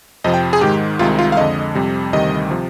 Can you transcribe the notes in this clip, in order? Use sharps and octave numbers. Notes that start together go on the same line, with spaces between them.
F2 C3 F3 D#5
G5
G#4
G#2 D#3 G#3 G4
C2 C3 D#3 G#3 F4
F4
F5
F2 D3 G#3 D#5
F2 C3 G3
D2 C3 D#3 G3 D#5
C3 F3